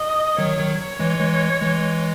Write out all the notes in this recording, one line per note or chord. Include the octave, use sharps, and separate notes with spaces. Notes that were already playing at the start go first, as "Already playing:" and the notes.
Already playing: D#5
D#3 F#3 C#5
D#3 F#3
C#5
E3 G#3
E3 G#3
E3 G#3